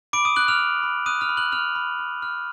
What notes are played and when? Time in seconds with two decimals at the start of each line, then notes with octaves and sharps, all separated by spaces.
0.13 B5 D6 D7
0.25 D#6 D#7
0.36 F#6 F#7
0.48 F6 F7
0.60 F#6
0.83 B5
1.06 D#6 F#6 D#7
1.21 F6 F7
1.29 B5
1.37 F#6 F#7
1.52 F6 F#6 F7
1.75 B5
1.99 F6
2.22 F6